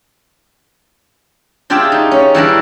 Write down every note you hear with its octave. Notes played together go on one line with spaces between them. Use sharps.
D4 F4 G4 G#4 E5 G5
D#4
C#4
E3 G3 D4 A#4